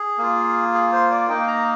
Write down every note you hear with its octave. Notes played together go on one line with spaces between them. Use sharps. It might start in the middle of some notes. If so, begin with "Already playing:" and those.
Already playing: G#4
A#3 F4
G#4
C5
D5
A#3 D#4 G5
A#5